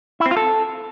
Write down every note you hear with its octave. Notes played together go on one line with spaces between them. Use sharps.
E4
C4
F4
A4